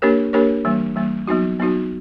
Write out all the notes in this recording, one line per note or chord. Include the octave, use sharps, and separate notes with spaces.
A#3 D4 G4 A#4 C#5
A#3 D4 G4 A#4 C#5
E3 G3 A#3
E3 G3 A#3
F#3 B3 D#4 F#4
F#3 B3 D#4 F#4